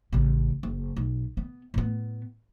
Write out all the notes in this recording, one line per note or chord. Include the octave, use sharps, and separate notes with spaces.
A1 C#3
F#1
B1
B3
A2 B3